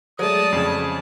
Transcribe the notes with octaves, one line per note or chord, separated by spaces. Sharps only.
F#3 G#3 A3 D5 A5 D#6
F2 C#3 G#4